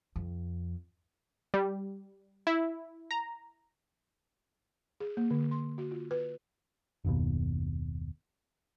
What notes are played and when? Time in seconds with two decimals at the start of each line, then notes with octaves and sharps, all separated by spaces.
0.16 F2
1.54 G3
2.47 E4
3.11 A#5
5.00 G#4
5.17 A#3
5.31 D3
5.51 C6
5.78 F#4
5.91 F4
6.11 B4
7.05 F#1 D#2 B2